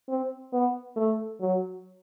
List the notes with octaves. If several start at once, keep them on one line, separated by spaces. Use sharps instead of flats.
C4
B3
A3
F#3